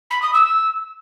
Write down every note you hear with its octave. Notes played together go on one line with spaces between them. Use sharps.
B5
D#6
E6